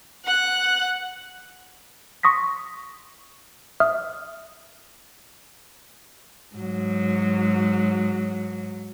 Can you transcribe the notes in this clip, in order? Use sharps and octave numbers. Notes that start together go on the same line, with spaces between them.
F#5 F#6
C6 C#6 D#6 A#6 B6
E5 D#6 F6
G#2 F#3